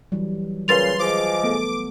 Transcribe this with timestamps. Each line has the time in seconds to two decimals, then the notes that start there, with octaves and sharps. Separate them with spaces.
0.12 E3 F#3 G3
0.68 A#2 C#3 B4 C6 A6 F7
0.99 F3 G#3 D6
1.44 A3 B3 A4